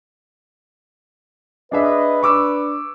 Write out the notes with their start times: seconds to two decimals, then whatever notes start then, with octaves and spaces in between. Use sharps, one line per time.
1.72 D4 G#4 B4 D#5 E5
2.23 D4 C#6 D6 E6